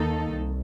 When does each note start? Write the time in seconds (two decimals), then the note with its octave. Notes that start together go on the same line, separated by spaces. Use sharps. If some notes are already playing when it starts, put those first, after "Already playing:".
Already playing: D#2 D#3 A#3 D#4 A4
0.33 C2